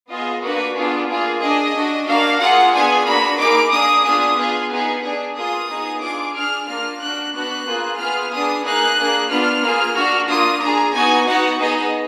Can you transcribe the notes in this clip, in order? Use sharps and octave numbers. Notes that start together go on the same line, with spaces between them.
B3 F4 G#4 D#5
A#3 D4 F#4 B4
B3 D4 F4 G#4
A#3 F4 G#4
D4 G#4 D#5
D4 F#4
A#3 D4 F#4 F5
A#3 F4 G#4 F#5
B3 D4 F4 G#4 G#5
A#3 D4 F#4 B5
A#3 D#4 G#4 D6
A#3 D4 G#4 D#6
B3 D4 F4 G#4 D#6
B3 F4 G#4
B3 D#4 G#4
D4 G#4
A#3 F4 G#4 D#6
B3 D#4 G#4
D4 F4 G#4 D6
D4 G#4 F6
A#3 D4 F4 F6
D4 F#4 F#6
B3 D4 F#4 F#6
A#3 F4 G#4
B3 F4 G#4 F6
B3 D4 G#4 D#6
A#3 D#4 G#4 F#6
A#3 D4 G#4
B3 D4 F4 F6
A#3 F4 G#4
D4 F#4
A#3 D4 F4 D#6
D4 G#4 A#5
B3 D#4 F#4 G#5
B3 D#4 F#4 F#5
B3 D#4 G#4 D#5